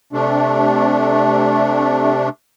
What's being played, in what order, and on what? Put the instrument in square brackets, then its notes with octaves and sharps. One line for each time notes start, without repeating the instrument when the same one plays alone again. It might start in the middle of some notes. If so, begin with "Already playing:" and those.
[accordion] C3 A3 D4